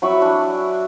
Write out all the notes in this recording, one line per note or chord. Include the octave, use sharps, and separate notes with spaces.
F#3 E4 B5 C#6
D4 G#5